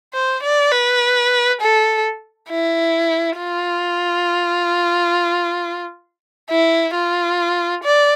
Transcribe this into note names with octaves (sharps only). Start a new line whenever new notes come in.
C5
D5
B4
A4
E4
F4
E4
F4
D5